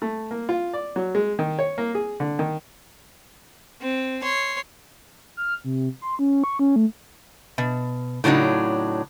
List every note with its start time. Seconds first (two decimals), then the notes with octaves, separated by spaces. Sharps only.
0.02 A3
0.31 A#3
0.49 F4
0.73 D5
0.96 F#3
1.15 G#3
1.39 D#3
1.59 C#5
1.78 A#3
1.95 G#4
2.20 D3
2.39 D#3
3.81 C4
4.22 C#5 C6
5.37 F6
5.64 C3
6.02 C6
6.19 C#4
6.44 C#6
6.59 C#4
6.76 A3
7.58 B2
8.24 A2 C#3 F#3 D4 D#4